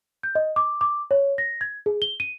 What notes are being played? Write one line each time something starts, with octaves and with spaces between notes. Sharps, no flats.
G6
D#5
D6
D6
C#5
A#6
G#6
G#4
G7
D#7